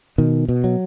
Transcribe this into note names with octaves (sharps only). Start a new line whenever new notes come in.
B2 D#3
B2
F#3